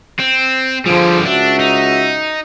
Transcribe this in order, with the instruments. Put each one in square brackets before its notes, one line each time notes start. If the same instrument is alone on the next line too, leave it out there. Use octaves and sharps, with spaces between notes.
[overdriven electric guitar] C4
[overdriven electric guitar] D3 G3 [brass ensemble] F3 G#4
[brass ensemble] C#2 F#4 E5 [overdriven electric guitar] D4
[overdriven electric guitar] D#4